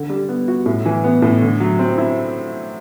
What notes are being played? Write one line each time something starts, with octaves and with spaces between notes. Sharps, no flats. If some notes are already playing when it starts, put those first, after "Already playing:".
Already playing: D3
G3
B3
F#4
A2
E3
B3
A2
D3
F#3
C4
E4